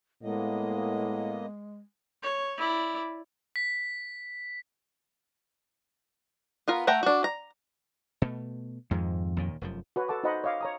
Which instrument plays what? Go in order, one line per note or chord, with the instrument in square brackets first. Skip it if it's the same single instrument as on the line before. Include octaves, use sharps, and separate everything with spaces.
[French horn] A2 [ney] G#3 [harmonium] A#3 B3 D#5
[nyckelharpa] C#5
E4 D5
[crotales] B6
[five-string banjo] B3 F4 A#4
A3 E5 F#5 G5 A#5
D4 F#4
A#5
[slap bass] B2 A3
[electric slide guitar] F2 [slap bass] G#2 D#3 G#3
[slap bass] D#2 A#2 D#3
F1 F#2 F3
[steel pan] F#4 B4 C#5
A4 F#5 A5 D6
D#4 F#4 C5 D#5 F#5 B5
C#5 D#5 F5 D6
C#5 A#5 D#6